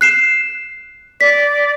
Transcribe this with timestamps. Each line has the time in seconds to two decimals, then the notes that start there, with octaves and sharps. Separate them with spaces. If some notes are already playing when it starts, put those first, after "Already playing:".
0.01 F#6 C7 E7
1.21 D5 B6